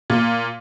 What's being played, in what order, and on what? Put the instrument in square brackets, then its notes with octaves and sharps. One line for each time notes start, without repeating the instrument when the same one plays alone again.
[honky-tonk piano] A#2